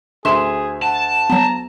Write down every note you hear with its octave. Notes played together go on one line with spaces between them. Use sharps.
D2 G#4 E5 C6 E7
F#5 A5
F#3 B3 A#5